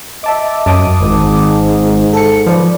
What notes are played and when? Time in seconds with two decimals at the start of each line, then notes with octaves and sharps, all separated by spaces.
0.24 D#5 E5 A5 D6
0.66 F#2 A5 D6 D#6
1.01 G#1 G#2
2.13 A4 C#7
2.46 F3 B4 D5